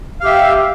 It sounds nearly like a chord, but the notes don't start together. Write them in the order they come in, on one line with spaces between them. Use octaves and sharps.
F5 G4 E5